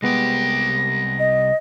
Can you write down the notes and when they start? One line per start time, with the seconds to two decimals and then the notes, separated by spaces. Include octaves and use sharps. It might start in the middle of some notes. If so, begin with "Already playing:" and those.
0.02 C2 G#3 B3 G4 A#6
1.19 D#5